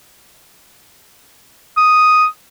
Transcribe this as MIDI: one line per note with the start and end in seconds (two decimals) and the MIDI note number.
1.78 2.26 87